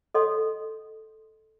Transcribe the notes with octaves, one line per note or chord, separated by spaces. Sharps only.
A4 C#5 D#5 F#5 C6 D#6